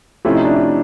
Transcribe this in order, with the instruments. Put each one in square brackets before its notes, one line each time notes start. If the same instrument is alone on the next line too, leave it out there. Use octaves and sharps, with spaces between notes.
[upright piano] C3 F3 A3 C#4 F4 [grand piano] E4
[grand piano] D#4
D4
D#4